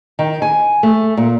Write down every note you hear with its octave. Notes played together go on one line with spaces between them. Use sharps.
D#3
G#5
A3
A#2